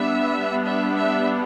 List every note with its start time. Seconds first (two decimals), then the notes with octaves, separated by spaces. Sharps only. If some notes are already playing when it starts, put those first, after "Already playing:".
Already playing: G3 B3 D4 E5
0.64 E5
0.95 E5